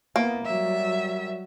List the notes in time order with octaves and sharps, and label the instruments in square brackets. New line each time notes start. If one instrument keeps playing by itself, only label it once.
[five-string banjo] A#3 [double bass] B3 E4
[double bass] F#3 G3 [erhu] E5